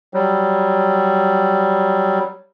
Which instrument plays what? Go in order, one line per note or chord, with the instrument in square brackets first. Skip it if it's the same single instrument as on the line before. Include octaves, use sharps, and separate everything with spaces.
[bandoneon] F#3 G3